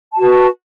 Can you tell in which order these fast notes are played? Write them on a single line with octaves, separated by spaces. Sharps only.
A5 F#4 B4